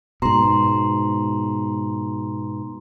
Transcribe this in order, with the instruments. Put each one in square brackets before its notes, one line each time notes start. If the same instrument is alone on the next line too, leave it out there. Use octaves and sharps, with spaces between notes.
[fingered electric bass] G#2 B2 [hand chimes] A#5 C6